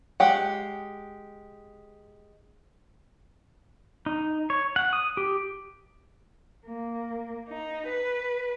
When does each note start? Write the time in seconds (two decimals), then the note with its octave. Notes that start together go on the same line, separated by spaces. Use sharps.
0.20 G#3 G4 F#5
4.06 D#4
4.50 C#5
4.76 F#5
4.93 D#6
5.17 G4
6.66 A#3
7.47 D#4
7.87 B4